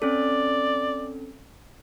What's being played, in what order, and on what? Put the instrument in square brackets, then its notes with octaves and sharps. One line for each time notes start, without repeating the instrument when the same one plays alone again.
[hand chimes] C4 C#4 A4 [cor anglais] D5